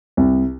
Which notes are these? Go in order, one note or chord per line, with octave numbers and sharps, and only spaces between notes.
C2